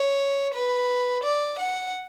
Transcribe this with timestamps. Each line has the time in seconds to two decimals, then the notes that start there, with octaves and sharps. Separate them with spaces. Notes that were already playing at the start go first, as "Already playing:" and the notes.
Already playing: C#5
0.54 B4
1.24 D5
1.59 F#5